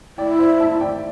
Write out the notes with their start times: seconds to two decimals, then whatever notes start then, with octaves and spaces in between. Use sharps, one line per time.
0.17 E4 D5 G5
0.39 C5 E5
0.60 E5 A5
0.81 D5 G5